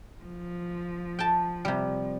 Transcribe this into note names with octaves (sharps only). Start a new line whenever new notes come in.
F3
G5 A5
C3 G3